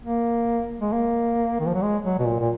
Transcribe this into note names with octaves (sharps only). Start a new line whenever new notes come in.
A#3
G#3
A#3
D#3
F3
F#3
G#3
F#3
B2
A#2
A#2